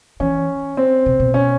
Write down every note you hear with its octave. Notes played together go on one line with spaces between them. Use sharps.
E3 C#4
C4
B2
B2
C#4